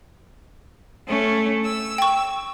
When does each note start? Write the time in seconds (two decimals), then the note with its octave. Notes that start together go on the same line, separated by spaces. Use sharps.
1.06 A3 C#4
1.64 E6
1.98 G5 C#6